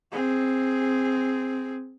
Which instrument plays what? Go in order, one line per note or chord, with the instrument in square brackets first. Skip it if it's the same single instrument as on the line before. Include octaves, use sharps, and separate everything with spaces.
[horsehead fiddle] C4 G#4